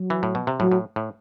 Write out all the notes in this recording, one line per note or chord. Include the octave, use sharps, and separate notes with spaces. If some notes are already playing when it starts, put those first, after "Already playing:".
Already playing: F#3
E3
A2
B2
C3
A2 F#3
A2
A2